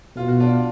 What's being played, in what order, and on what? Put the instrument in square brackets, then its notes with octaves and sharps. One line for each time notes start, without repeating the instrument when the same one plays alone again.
[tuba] B2 [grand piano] F4
[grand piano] F#4
D4 F4